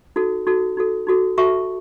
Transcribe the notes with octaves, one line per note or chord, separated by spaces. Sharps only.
D#4 F#4 A4
D#4 F#4 A4
D#4 F#4 A4
D#4 F#4 A4
F#4 A4 E5 A5 C#6